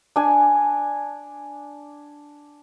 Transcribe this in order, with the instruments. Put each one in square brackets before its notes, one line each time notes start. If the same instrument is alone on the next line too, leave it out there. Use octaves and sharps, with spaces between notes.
[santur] D4 G#5